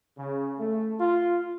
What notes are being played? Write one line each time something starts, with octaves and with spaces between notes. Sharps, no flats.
C#3
A3
F4